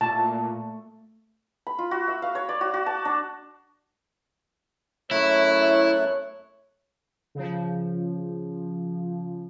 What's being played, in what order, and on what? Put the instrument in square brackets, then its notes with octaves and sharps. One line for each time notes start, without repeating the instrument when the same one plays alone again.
[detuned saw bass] A#2 [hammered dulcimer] A3 [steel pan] A5
[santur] B5
F4
F#4
E5
F5
C#5
D5
F#4
F#4
A5
D4
[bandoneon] F#2 A3 F#6 [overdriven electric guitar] E4 [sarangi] C#5
[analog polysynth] C#3 F3